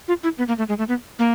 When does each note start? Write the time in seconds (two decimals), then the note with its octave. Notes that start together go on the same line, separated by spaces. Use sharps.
0.08 F4
0.23 E4
0.38 B3
0.48 A#3
0.58 A3
0.69 G#3
0.78 A3
0.88 B3
1.19 A#3